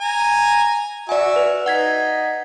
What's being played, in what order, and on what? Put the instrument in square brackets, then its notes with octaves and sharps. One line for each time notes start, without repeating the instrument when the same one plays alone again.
[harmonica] G#5 A#5
[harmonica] F#4 E5 [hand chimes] D5 G#5
[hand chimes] B4
[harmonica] D#4 [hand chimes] F#5 G#6 B6